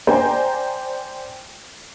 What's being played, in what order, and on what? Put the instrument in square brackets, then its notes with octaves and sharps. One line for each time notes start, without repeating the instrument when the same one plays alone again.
[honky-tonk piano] C5 D5 G5 G#5 A#5